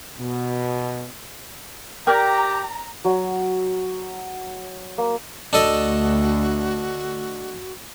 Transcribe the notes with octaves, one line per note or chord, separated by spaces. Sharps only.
B2
G4 A#4 D5 G5 A#5
F#3
A#3
D2 D4 F#4 A4 D#5